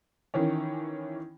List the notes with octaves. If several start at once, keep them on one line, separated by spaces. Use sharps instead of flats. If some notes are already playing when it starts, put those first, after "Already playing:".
D#3 E3 C#4